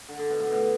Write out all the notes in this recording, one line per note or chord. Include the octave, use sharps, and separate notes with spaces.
D3
D3
B2
A2
B2